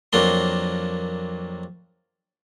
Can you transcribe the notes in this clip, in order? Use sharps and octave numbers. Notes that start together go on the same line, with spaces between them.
F2 F#3 A#3 D4 C6